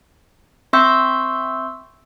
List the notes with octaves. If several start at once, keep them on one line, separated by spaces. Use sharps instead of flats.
C4 E5 C6 C#6 E6 G6